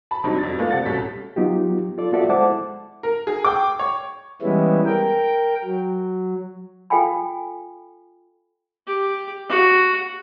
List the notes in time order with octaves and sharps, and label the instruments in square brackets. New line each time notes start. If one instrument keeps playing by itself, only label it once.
[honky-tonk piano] A5 B5
G1 C3 F#3 D4 D#4
F2 F#3 A6
G#3 A3 B3 F4 A4 D5
C3 F#5 A6
C2 B2 C#4 A4 B6
[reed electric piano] F#3 B3 D#4 F4 G4
F4 A4 D5
B3 F4 F#4 A4 D5 E5
G#3 E4 C5 F#5 A5 D6
[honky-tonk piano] A#4
G#4
G5 D6
C#5
[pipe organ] E3 G3 G#3 B3 C#4 E4
A#4 G5
F#3
[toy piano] F4 A4 F5 G5 G#5 B5
[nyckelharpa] G4
F#4